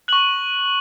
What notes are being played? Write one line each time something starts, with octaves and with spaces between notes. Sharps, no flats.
C#6 F#6 F#7